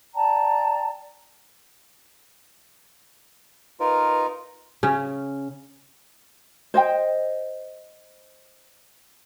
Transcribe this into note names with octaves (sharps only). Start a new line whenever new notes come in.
D5 G5 A5 A#5
D#4 F4 A#4 B4
C#3 C#4
C5 D#5 G5